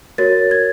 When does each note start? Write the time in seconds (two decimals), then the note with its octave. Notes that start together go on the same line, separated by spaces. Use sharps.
0.18 F#4 A#4 C#5 A6
0.51 G#6